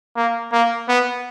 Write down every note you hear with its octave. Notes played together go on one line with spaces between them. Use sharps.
A#3
A#3
B3